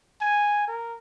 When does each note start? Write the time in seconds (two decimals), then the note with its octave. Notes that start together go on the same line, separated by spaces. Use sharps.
0.21 G#5
0.68 A#4